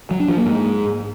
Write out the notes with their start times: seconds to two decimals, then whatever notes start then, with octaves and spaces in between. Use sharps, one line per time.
0.11 F#3
0.20 D4
0.28 F3
0.37 A#3
0.46 G#2